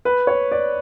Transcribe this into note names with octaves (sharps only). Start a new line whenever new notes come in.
B4
C#5
D5